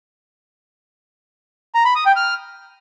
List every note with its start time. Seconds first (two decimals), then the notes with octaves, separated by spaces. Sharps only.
1.75 A#5
1.85 B5
1.95 D#6
2.06 G5
2.16 F6